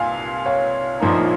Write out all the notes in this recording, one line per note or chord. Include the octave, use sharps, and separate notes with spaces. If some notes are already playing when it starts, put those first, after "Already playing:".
Already playing: C2 A#2 F5 G#5
C#5 F5
A#1 A#2 F3 A#3 D#4